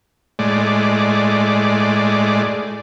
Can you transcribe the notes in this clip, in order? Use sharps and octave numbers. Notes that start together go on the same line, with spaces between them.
A2 G#3 D5